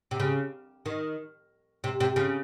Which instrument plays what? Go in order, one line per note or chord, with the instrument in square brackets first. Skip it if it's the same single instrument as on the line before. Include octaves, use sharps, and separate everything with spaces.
[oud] C3
C#3
D#3
C3
C3
C#3